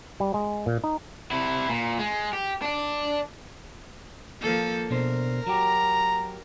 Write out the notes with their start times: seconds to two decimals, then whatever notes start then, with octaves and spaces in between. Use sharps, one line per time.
0.20 G3
0.34 G#3
0.66 A#2
0.84 D#4
1.32 C3 E4
1.69 A#2
1.99 G#3
2.33 G4
2.62 D4 D5
4.41 F3 A#3 A4
4.90 B2 D4 A#4 C5
5.47 F#3 F#4 G4 A#5